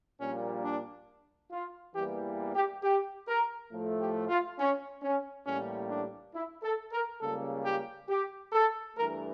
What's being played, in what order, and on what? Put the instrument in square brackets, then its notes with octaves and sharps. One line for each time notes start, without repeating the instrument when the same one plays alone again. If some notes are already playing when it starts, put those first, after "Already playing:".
[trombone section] A#1 A#2 G3 A#3 C#4
D4
F4
E2 E3 G3 A#3 G4
G4
G4
A#4
A2 F3 A3
G4
F4
C#4
C#4
A1 A2 G3 A#3 C#4
D4
E4
A4
A#4
C#2 C#3 G3 A#3 A4
G4
G4
A4
G2 E3 A3 A#4